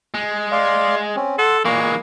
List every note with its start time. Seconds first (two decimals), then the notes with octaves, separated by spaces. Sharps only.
0.14 G#3
0.52 D5 F5 C6
1.16 C4 C#4
1.38 A4 F#5 C6
1.65 A#2 E3 G#3 A#3 C#6